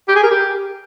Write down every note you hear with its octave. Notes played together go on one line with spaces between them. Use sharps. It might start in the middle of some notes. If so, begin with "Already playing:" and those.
G4
G#4
A#4
G4